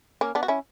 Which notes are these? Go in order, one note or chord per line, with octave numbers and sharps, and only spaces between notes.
A#3 C#4
B3 D4
F#4
C#4 E4